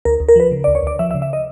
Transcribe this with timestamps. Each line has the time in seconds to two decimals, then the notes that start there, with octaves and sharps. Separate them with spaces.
0.05 D2 A#4
0.20 D2
0.28 A#4
0.36 F3 B4
0.52 C#3
0.64 D5
0.67 D2
0.75 C#5
0.83 D2 D5
0.99 F3 E5
1.11 E5
1.14 C#3
1.22 E5
1.33 D#5